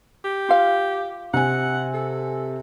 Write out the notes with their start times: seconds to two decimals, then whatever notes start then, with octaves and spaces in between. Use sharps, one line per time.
0.24 G4
0.49 F4 F5
1.34 C3 F#5 G#5
1.94 A4